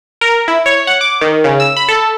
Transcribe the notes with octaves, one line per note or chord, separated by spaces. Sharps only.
A#4
E4
C#5
F#5
D6
D#3
C#3
E6
B5
A4